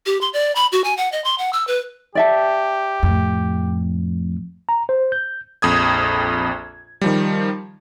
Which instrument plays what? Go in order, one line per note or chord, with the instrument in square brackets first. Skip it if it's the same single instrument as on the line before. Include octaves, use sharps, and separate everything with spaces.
[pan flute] G4
C6
D5
B5
F#4
G#5
F#5
D#5
C6
F#5
E6
B4
[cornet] G4 [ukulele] D5 E5 A5
[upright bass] F2 A2
[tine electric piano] A#5
C5
G6
[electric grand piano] A#1 F2 D#6 G#6
D#3 F3 G3